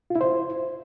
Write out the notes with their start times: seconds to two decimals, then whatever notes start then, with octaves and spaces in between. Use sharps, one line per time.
0.10 F4
0.16 E4
0.21 C5